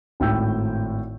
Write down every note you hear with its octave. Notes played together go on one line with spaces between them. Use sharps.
G#1 A2 G5 E6 G6